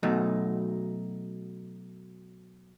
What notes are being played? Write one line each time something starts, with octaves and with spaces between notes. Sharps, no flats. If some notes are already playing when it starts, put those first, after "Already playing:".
B2 F#3 A3 D#4